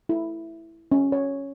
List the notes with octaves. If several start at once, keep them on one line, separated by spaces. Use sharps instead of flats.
E4
C#4
C#5